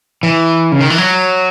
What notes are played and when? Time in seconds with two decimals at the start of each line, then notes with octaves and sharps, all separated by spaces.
0.23 E3
0.72 C#3
0.81 D#3
0.90 E3
0.98 F#3